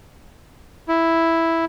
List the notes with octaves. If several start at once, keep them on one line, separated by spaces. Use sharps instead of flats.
E4